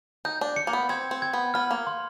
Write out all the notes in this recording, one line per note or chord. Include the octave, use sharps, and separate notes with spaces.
D#4 G6
D4
C#7
A#3
B3
C4 G#6
C4
G#6
B3
B3 F6
A#3
C6